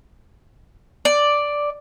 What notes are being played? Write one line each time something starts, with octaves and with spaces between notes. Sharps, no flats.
D5